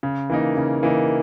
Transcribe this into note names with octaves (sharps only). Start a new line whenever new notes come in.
C#3
E3 A#3 D#4
C#3
E3 A#3 D#4